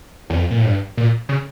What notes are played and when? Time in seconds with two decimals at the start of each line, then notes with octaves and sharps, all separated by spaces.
0.30 E2
0.35 F2
0.51 A#2
0.58 A2
0.65 G2
0.97 A#2
1.29 C#3